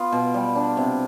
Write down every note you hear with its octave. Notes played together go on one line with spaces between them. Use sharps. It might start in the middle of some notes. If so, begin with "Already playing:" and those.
Already playing: B3 F4
B2
G3
D4
C3